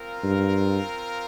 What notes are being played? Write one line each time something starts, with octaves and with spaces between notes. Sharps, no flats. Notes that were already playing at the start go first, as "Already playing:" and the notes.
Already playing: C4 F4 A#4 F5
G2